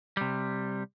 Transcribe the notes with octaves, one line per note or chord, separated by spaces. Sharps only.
C3 G3